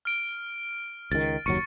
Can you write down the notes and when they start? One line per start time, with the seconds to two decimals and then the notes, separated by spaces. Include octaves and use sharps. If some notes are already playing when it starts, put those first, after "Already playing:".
0.05 F6 D7
1.12 C#2 D#3 A6
1.46 F#1 D#2 F#3 C#6 C#7